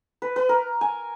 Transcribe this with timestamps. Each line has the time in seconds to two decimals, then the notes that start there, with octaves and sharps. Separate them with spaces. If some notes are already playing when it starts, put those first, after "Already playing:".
0.22 B4
0.36 B4
0.49 A#4
0.81 G#5